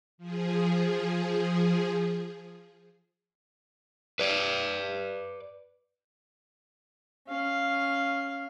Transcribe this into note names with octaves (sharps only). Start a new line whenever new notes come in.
F3 G#4
B4 D5
C#4 F5